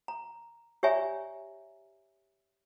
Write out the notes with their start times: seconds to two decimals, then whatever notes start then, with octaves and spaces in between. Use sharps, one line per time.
0.08 A#5
0.83 G4 C#5 D5 E5 G#5 A#5